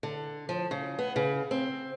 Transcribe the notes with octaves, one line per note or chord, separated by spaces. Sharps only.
D3
F3
C#3
B3
C#3
C4